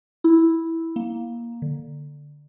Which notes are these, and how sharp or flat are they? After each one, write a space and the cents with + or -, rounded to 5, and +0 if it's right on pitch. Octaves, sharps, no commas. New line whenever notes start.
E4 -5
A#3 +10
D3 +5